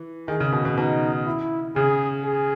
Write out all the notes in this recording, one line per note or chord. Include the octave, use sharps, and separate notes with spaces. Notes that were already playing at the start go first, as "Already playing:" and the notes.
Already playing: E3
D#3 G#4
C#3
B2
B2
B2 D#4
E4
C#3 G#4
G#4